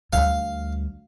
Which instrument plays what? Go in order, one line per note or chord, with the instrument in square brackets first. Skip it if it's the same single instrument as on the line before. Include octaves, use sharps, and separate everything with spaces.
[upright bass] D2 G3 [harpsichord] F5